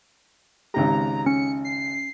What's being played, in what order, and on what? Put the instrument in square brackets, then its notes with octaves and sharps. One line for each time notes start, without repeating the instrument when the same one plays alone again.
[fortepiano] G#1 C#2 G4 [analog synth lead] A#5
[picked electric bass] C#4 [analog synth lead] C#7
[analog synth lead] C7